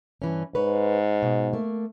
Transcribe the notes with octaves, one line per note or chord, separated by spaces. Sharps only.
G2 E3 C#4
G#2 B4 C#5
B2
A3 A#3